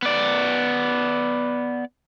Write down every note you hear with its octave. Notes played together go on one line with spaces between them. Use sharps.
B3 D5